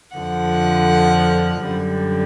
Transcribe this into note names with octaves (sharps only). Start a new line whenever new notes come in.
F2 D3 F3 F#5
F#2 D3 G3